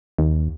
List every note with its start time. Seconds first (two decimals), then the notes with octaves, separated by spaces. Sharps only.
0.19 D#2